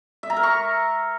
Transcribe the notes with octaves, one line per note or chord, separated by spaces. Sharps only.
E5
A#5
A#4
C#6